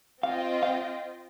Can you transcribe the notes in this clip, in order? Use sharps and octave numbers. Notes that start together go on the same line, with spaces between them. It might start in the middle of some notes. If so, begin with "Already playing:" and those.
C4 F4 D#5 F5 G5
F5